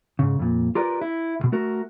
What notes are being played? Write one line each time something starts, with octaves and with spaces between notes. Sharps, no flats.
G#2 C#3
F2 A#2
F4 G4 A#4 B4 D5
E4
C#2 B2
A3 F#4 A#4